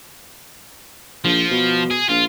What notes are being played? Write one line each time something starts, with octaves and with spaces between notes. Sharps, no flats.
A#1 F3
B2
G#4
A#1 F4